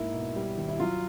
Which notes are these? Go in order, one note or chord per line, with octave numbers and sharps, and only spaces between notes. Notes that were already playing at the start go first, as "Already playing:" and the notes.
Already playing: G#2 A#3 E4
B2
G3
D#2
E4
F#3 F4